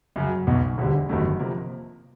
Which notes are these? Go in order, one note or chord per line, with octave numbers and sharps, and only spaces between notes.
F#2 C#3 F#3
B1 B2 F#3
E1 D2 D3 G3
G1 G2 D#3 F#3 A3
C3 F3 A#3